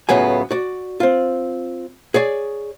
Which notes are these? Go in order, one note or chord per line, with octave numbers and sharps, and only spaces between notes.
C#2 A2 C#3 F#3 B3 G#5
F#4 D5
C4 F4
G#4 C#5 D5